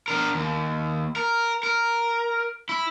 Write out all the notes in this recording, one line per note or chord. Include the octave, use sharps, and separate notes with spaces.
D4 A#4
D#2
A#4
A#4
E4